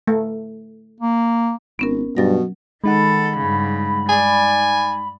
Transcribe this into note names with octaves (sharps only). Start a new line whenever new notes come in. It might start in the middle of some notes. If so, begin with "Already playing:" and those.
A3
A#3
G#1 B3 C#4 A#4
G2 B2 F#3 A6 A#6
D#3 G#3 D#4 A4 F#5 B5
G2 C#3
D5 G#5